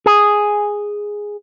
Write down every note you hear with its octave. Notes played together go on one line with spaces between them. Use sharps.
G#4